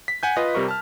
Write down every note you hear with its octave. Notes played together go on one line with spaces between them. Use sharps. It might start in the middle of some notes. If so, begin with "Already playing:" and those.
B6
F#5 G#5 G6
F4 B4 D#5
C3 G3 A#4 C#6
A5 F6